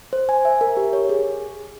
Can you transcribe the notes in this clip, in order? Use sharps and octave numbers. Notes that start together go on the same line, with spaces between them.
C5
G#5
E5
A#4
G4
C#5
G#4